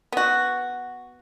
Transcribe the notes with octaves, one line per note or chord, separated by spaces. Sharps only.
B3 F#4